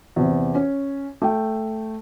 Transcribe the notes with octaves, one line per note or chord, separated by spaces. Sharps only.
E2 C3
C#4 C#5
A3 G5